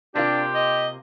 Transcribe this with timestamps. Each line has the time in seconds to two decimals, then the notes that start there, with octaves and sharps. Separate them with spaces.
0.15 C3 A#3 D4 F4 G4
0.54 D#5